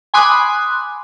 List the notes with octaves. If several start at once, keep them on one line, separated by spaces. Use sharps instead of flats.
G#5 B5 C6 D6 D#6 F#6